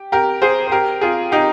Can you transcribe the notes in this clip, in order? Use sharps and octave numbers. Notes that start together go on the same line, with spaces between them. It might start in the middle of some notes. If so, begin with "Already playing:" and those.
Already playing: G4
G4 A#4
G#4 C5
C5
G4 A#4
F4 G#4
D#4 G4